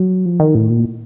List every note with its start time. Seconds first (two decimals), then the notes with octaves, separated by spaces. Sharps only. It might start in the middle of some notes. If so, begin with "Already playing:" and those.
Already playing: F#3
0.26 F3
0.40 D#3
0.55 A2
0.70 A#2